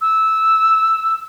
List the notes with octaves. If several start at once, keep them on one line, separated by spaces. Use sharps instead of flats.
E6